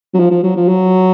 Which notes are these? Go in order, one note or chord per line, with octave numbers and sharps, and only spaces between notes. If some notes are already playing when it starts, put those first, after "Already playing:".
F#3
F3
F3
F#3
F3
F#3